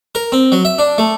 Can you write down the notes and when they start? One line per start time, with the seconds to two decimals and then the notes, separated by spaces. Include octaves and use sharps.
0.15 A#4
0.32 C4
0.52 F#3
0.65 E5
0.78 D4
0.98 A3